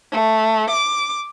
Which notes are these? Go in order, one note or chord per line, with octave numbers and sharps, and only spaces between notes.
A3
D6